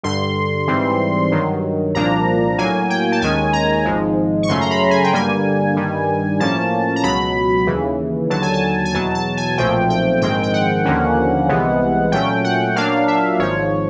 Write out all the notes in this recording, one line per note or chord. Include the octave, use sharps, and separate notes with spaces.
G2 D3 G3 C6
G#2 E3 G3 C4
G2 D#3 F#3
C2 A#2 F3 A#3 D4 A#5
A2 F#3 A#3 G#5
G5
A5
D#2 D#3 G#3 C#4 G#5
A#5
G#1 G#2 F3 G#3
C#6
F#2 C#3 F#3 A3 C#4 C6
A#5
B5
G#5
G5
G2 D3 G3 A#3 G#5
G2 D#3 G3
A2 F3 A#3 C#4 A5
A#5
C#2 B2 F#3 B5
D#2 C#3 E3
D#2 D3 F#3 A5
G#5
A5
G#5
E2 B2 F#3 A5
A5
G#5
B1 A#2 F3 A3 C4 G5
G5
A#1 G#2 D#3 G#3 C4 G5
G5
F#5
D#2 D3 F3 A#3 C#4
C2 C3 E3 G#3 B3
A#2 F#3 A3 C#4 G5
F#5
A#2 F#3 A#3 D4 F5
E5
G#1 G#2 F3 C#5